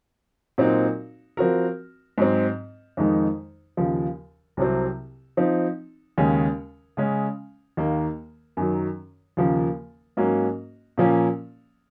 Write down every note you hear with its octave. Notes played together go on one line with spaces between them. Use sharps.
A#2 F#3 C4 D#4 F#4
F3 C4 F#4 A#4
G#2 F#3 C4
F2 D#3 G#3 D#4
D#2 C#3 F3
C2 C3 F#3 C4
F3 C4 D#4
D#2 C#3 G#3 C#4
C#3 G#3 C#4
D#2 D#3 A#3
F#2 D#3 F#3
D#2 C#3 F3 A#3
G#2 F#3 A#3 C#4 F#4
A#2 F3 A#3 C#4